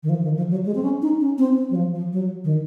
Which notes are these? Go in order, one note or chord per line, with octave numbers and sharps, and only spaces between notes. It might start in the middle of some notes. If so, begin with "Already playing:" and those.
D#3
F3
D#3
F3
F#3
G#3
C4
C#4
D#4
C#4
C4
C4
F#3
F3
F3
F#3
D#3